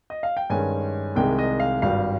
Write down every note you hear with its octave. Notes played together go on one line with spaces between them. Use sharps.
D#5
F5
G5
G2 D#3 G#3 C#4 G#5
C2 C3 D#3 G#3 G5
D#5
F5
G#1 G2 G3 F5